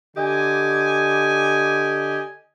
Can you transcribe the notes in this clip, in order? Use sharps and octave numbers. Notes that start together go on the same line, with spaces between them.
D3 G4 D#5 G#5